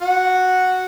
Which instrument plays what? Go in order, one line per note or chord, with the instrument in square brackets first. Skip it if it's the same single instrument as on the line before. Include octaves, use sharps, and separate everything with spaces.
[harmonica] F#4 F#5